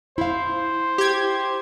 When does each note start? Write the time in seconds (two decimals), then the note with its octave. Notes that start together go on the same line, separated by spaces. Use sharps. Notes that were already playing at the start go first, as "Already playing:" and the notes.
0.18 E4 C5 F5
0.98 G4 G#6